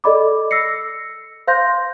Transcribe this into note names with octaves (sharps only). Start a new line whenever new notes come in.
A4 D5 D#5 B5 D6
E6 A#6 C7 C#7
C5 F5 C6 G6 A#6